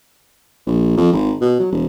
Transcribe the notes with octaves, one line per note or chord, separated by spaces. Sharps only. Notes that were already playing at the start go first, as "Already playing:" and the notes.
A#1
F2
G#1
B2
F#3
E1